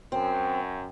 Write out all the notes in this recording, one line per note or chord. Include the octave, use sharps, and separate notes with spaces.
F#2 C4